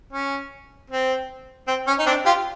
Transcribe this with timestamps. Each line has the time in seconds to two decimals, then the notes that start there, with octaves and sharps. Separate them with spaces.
0.13 C#4
0.90 C4
1.68 C4
1.87 C#4
1.99 D#4
2.06 C4 D4
2.26 F4 G4